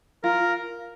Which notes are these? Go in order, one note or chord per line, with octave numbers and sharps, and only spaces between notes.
F4 A#4